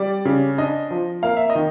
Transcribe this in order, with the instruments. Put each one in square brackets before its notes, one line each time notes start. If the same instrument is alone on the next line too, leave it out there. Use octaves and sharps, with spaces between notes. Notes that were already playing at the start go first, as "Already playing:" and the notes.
Already playing: [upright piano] G3 D5
C#3
D4 D#5
F3
A#3 F5
E5
D#5
D#3